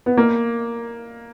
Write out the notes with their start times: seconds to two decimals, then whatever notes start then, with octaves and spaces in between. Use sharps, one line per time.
0.06 B3
0.17 A#3